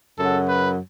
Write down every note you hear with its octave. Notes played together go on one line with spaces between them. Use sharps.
F#2 C#3 F#3 A4
B4